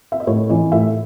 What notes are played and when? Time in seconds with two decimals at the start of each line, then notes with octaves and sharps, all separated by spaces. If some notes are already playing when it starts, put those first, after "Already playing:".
0.12 E5
0.20 D#5
0.27 A2 C#5
0.50 E3 D#5
0.72 A2 E5